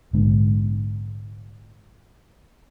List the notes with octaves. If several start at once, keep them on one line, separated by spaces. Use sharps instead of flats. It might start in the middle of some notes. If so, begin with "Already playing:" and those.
A#1 G#2 D3 B3